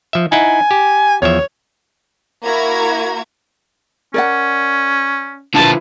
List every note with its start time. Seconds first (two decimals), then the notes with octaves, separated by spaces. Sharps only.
0.13 F3 E5
0.32 D#4 E4 F#5 G#5
0.71 G4
1.22 E2 F3 C#5 E5
2.43 A#3 E4 F#4 A#5 G#6
4.14 C#4 A#4 D5 F#5
5.55 D3 F3 E4 F4 B4 A5